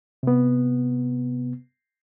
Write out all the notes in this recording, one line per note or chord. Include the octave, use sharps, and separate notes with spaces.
C3 B3